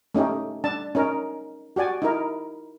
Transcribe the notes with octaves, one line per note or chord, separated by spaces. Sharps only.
A3 C#4 D#4 G4
D4 A5
C#4 D#4 A#4
F#4 G4 D5 G#5
D#4 E4 A#4